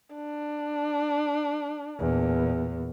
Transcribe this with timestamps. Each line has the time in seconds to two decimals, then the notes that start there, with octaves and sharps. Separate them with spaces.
0.15 D4
1.99 E2 A#2